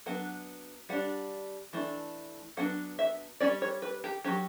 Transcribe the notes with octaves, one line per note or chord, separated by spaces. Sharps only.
F#3 B3 D4 F#5
G3 D4 F#5
E3 A3 D4
F#3 B3 D4 F#5
E5
G3 C#4 D5
C#5
B4
G4
F#3 C#4 G4